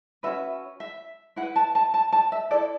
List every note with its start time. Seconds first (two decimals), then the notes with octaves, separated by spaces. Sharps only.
0.23 C#4 F#4 B4 E5
0.80 E5
1.36 E4 F#5
1.42 B4
1.56 A5
1.75 A5
1.94 A5
2.12 A5
2.32 E5
2.51 E4 A4 D5